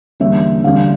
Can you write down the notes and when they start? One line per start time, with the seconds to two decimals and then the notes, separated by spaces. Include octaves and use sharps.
0.20 E2 D3 G3 A#3 C#4 E5
0.64 D2 D3 G3 C#4 F5